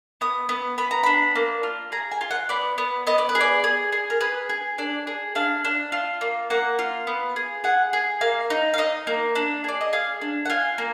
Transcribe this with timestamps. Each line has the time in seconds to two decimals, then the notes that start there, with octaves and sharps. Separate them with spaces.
0.21 B3 D#6
0.49 B3
0.78 B3 B5
0.91 A#5
1.03 D4 B5
1.35 A#3
1.63 F4
1.92 G#4 A#5
2.11 G#5
2.21 F4
2.31 F#5
2.49 B3 D5
2.78 B3
3.07 B3 D#5
3.18 D5
3.29 B4
3.35 G#4
3.41 D5
3.64 G#4
3.92 G#4
4.10 A#4
4.21 G#4 B4
4.49 G#4
4.78 D4 D5
5.07 G#4
5.35 D4 F5
5.65 D4
5.92 F4
6.21 A#3
6.50 A#3 F#5
6.79 F4
7.07 B3
7.36 G#4
7.64 G#4 F#5
7.93 G#4
8.21 A#3 F5
8.50 D#4
8.74 F5
8.78 D#4 D#5
9.07 A#3
9.35 D4
9.64 G#4 D5
9.81 D#5
9.93 G#4 F5
10.21 D4
10.45 F#5
10.50 F4 G#5
10.78 A#3